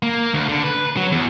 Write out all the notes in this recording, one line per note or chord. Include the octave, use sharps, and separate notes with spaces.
A#3
D2
D3
B4
F#3
E2